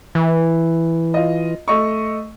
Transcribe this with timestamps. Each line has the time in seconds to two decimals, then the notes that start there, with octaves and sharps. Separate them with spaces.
0.15 E3
1.14 F4 D#5
1.68 A3 D#5 C#6